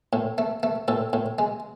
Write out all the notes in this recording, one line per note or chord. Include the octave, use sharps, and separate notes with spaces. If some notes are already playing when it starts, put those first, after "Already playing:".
A2
A3
A3
A2 A4
A2
G#3